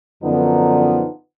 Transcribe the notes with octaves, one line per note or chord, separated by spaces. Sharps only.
F#2 D3 F3 B3 D#4